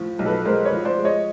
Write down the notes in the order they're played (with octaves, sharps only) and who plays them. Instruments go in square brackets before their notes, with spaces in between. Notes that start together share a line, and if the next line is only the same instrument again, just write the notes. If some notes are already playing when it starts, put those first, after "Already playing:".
Already playing: [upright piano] A2 F3
B1
A4 B4
G#3 A#4 C5
B4 C#5
F3
C5 D5
G#3
C#5 D#5